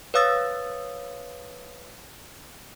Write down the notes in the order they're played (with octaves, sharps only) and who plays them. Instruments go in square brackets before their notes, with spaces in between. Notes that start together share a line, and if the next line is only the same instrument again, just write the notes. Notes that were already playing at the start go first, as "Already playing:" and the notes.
[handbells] B4 C#5 F5 D#6 E6 A6